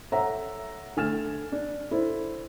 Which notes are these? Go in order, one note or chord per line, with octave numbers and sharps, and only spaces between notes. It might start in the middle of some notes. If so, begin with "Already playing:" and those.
A4 C#5 E5 F#5 A#5
D3 A3 G#5 F6 A6 E7
D4
D4 E4 A4 C5